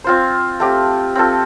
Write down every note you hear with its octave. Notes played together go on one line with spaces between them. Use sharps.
C4 F4 C5
A3 C4 G4
C4 F4 A4